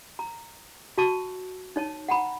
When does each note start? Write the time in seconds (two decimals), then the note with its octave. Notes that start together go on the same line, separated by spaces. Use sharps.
0.19 A#5
0.98 F#4 A5 C#6
1.76 D#4 C#5 A5
2.09 F#5 G5 A#5 B5